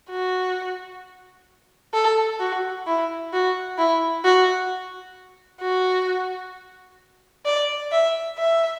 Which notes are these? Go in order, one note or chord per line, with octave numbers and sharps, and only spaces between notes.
F#4
A4
F#4
E4
F#4
E4
F#4
F#4
D5
E5
E5